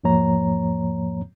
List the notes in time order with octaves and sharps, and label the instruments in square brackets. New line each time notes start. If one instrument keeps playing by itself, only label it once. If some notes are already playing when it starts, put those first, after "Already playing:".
[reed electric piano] E2 G#2 F3 A#3 C#5 A#5